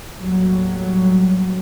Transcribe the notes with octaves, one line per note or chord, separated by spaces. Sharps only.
D#2 A2 F#3 G3